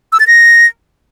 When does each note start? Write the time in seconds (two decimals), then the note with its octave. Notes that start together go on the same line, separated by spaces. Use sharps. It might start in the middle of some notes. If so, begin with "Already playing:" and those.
0.12 E6
0.20 A6
0.27 A#6